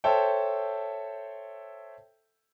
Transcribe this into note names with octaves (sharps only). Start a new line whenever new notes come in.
A4 C5 C#5 E5 G5 A5